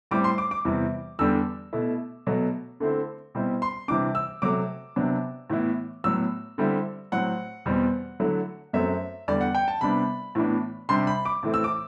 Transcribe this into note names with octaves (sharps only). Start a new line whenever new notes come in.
A2 G3 C4 E4 D6
C6
D6
D6
E2 C3 E3 G3
E2 D3 G3 D4 E6
B2 A3 E4
B2 F#3 A3
D3 A3 C4 E4
B2 G3 C4 E4
C6
C3 E3 G3 D4 D6
E6
C3 F#3 A3 D6
C3 F#3 B3 D4
A2 E3 B3 E4
A2 F#3 B3 E6
D3 G3 C4 E4
A2 F#3 C4 F#5
E2 B2 G3 C4
D3 F#3 A3 E4
F#2 F#3 A3 C4 E5
E2 D3 G3 D5
F#5
G5
A5
C3 G3 B3 D4 B5
A2 E3 B3 D4
C3 G3 D4 C6
B5
D6
A2 E3 A3 C4
E6
D6